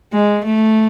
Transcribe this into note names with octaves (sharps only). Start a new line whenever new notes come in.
G#3
A3